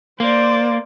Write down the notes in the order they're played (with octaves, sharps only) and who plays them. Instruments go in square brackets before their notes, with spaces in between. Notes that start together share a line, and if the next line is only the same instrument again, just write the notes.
[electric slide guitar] A#3 [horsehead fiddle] C5 D5